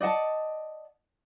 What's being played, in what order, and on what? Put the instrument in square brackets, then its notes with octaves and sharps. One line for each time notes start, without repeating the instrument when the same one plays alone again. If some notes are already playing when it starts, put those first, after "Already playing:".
[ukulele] D5 D#5 F#5 A5